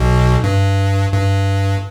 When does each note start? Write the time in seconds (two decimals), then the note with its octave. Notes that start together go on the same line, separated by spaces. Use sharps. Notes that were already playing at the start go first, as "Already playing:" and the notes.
Already playing: B1 B2
0.44 G2
1.13 G2